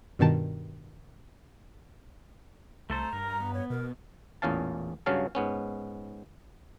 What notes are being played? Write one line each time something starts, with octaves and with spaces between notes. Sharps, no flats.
G2 B2 D#3 A5
C2 A3 A4 C5 A#5
G2 A#4
B3
C#5
B2 A#4
A1 E2 A#2 C#4 F5 A5
G2 C#3 F#3 C#4 F5 A5
G#2 B3 C#4